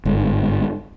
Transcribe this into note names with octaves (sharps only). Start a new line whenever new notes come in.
G1 G#2